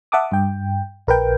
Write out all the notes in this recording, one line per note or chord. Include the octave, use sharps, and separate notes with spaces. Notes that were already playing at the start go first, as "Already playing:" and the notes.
E5 F#5 A5 D6 D#6
G2 G5
A#1 A#4 B4 G5